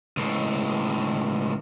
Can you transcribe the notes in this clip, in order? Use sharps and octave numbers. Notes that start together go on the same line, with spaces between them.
C#2 A2